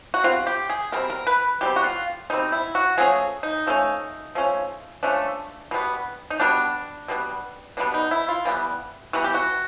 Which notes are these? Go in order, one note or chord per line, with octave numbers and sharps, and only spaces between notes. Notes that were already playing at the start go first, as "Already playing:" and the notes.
F#4
B2 G3 C4 F4
G4
G#4
B2 G3 C4 A#4
A#4
B4
B2 G3 C4 G4
F#4
F4
B2 G3 C4 D#4
E4
F#4
F3 A3 C#4 G#4
D#4
F3 A3 C#4
F3 A3 C#4
F3 A3 C#4 D4
B2 G3 B3
D#4
B2 G3 B3 D4
B2 G3 B3
B2 G3 B3 D4
D#4
E4
F4
E3 G3 B3
E3 G3 B3 F#4
G4
F#4